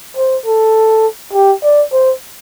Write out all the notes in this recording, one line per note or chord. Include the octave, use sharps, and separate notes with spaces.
C5
A4
G4
D5
C5